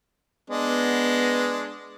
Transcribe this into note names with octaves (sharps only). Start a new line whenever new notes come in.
G#3 B3 D4 D#5